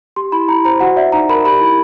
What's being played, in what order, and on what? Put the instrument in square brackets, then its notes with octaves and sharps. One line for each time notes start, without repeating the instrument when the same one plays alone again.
[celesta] G4 C6
E4 B5
E4 A#5
C5 A#5
F#4 F#5
D5 E5
D#4 A#5
A#4 B5
G4 B5
E4